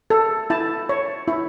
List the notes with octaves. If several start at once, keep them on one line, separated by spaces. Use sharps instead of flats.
A4
E4 A5
C#5
E4